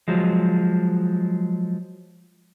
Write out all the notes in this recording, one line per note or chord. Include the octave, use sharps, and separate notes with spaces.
F3 F#3 G#3